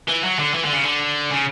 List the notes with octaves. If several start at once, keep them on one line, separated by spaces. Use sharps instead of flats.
E3
F#3
D3
E3
D3
C#3
D3
C#3